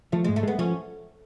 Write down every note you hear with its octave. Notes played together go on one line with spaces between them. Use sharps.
F3 A3
G#3
G#2
A3
G#3 B3
F3 C#4